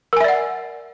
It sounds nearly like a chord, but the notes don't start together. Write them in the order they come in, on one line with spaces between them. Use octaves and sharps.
A#4 G#5 E5 D5 F#5